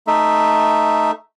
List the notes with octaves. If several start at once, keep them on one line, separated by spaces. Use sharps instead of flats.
A3 D#4 E5